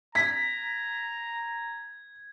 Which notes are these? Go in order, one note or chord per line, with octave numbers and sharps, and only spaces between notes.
A#5 G#6 B6